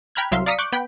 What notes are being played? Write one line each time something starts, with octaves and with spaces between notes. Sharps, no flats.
G5 A#5 B5 F6 F#6 G#6
C2 F#3 E5 F5 C6
D5 F5 A#5 D#6 B6 C#7
C#6 D6 F#6 G6
B3 G5 B5